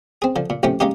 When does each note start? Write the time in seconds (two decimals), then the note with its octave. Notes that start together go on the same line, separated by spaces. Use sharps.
0.22 C4 G#4
0.36 D3 F3
0.50 A#2
0.63 A#1 A2 C3 C#4 G5
0.80 G#3 A#3 C#4 D#4 G4